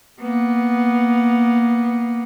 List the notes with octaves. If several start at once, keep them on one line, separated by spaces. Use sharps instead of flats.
A#3 B3